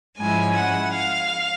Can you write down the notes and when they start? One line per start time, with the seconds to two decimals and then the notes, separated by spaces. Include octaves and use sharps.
0.18 G#2 F3 G#3 C#4 E4 G#5
0.56 F#5
0.92 F5